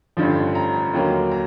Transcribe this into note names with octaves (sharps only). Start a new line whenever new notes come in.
A1 G2 D3 F3
A#5
D#2 D3 F#3 A#3
A#5